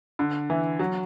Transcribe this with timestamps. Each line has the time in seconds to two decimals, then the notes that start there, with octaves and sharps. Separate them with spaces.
0.19 D3
0.50 E3
0.79 F#3